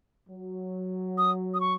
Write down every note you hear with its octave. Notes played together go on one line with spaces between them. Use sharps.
F#3
D#6
D#6
C#6